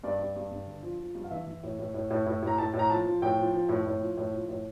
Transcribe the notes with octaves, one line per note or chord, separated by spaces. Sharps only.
G2 D5
G2
G2
G2
D3
F3
F3
G2
F5
E3 E5
E3
A2
A2
A2
A2
A2
A2 A#5
A2 A5
A2
A#5
F3 A5
F3
A2 G5
F3
F3
A2
A2
F3
A2
F3
A2